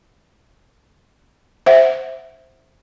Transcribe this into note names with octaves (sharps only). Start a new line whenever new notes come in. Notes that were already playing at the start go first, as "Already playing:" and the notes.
C5 E5 F#5